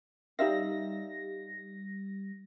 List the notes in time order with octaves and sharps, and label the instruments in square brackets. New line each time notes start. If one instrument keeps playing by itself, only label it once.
[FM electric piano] G3 A#6 [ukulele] D#4 E5 F5